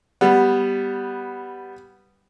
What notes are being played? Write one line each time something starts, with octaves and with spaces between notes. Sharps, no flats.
G3 B3